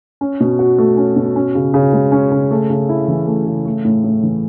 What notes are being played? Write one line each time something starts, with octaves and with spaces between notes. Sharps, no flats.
C#4
B2
F#4
A3
C#4
B2
C#4
C#3
C#3
G#3
C#4
C#3
A3
C#3
E4
E3
A3
C#3
A3
A2
A2
E3